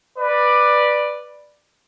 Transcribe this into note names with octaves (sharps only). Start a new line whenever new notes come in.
B4 D5